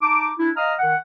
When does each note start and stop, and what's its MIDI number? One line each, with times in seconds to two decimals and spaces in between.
0.02 0.30 63
0.02 0.30 81
0.02 0.30 86
0.39 0.49 62
0.39 0.49 64
0.55 0.73 75
0.55 0.73 77
0.55 0.73 82
0.55 0.73 87
0.55 0.73 89
0.79 0.96 51
0.79 0.96 78